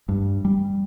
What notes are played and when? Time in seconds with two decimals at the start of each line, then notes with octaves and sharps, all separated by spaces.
0.09 G2
0.45 G3